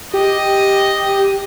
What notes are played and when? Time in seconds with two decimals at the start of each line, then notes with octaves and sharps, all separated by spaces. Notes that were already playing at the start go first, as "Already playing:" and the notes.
0.14 G4 D#5